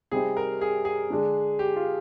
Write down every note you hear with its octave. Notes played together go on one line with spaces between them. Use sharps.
C3 G3 C4 D#4 G#4
A#4
G#4
G#4
D3 G#3 D4
G4
F4